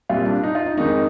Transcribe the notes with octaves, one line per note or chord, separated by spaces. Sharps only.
C2 A#2 G3 F4
D4
D#4
F4
D#4
F2 D#3 G#3 D#4